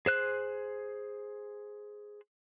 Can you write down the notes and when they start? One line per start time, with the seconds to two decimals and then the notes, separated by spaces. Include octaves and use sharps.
0.06 G#4 C5 F#6